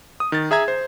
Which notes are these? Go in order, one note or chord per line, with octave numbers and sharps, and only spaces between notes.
D#6
D#3 A6
G#4 E5 A#5 G#6
C5